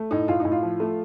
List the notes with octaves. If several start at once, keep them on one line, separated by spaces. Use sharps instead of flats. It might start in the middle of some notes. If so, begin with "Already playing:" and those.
Already playing: A3
A2 D#4
A2 F4
D#4
A2
F4
F3
A3